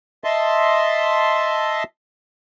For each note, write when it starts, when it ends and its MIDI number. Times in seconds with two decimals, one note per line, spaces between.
0.24 1.83 75
0.24 1.83 76
0.24 1.83 81
0.24 1.83 84